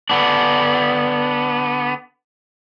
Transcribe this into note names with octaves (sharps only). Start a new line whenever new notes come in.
D3 B3 D4